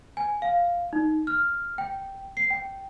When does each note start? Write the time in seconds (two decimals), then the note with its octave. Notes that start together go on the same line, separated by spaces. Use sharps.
0.17 G#5
0.42 F5
0.93 D#4
1.27 F6
1.78 G5
2.37 C7
2.51 G5